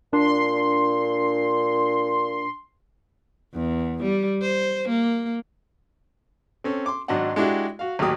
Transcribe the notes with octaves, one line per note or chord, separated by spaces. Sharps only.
A#2 D4 C6
E2
G3
C5
A#3
C4 C#4 A4
C6 D6
G#1 G#2 F#3 D4 D#5 F#5
G#3 D4 E4 F#4 G4
F#4 F5
A1 D#2 F#3 G4 D#6